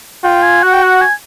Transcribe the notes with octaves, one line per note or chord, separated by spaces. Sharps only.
F4 G5
G#5
F#4 F#5
G5
F#5
G#5